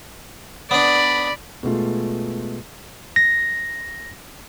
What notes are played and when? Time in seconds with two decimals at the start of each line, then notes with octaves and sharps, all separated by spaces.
0.71 B3 D4 D5 B5
1.63 B2 G#3 A3 F4
3.16 A#6